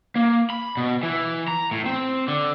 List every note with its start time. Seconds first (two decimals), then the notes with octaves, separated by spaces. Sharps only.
0.16 A#3
0.50 B5
0.77 B2
1.03 E3
1.48 A#5
1.71 A2
1.86 C4
2.28 D3